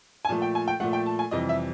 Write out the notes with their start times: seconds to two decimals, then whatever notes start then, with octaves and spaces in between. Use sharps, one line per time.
0.25 G#5
0.29 A#2 F3 A3 A5
0.42 G5
0.55 G#5
0.68 G5
0.80 A#2 F3 A3 F#5
0.93 G5
1.06 A5
1.19 G#5
1.31 F2 C3 E3 G3 D#5
1.49 E5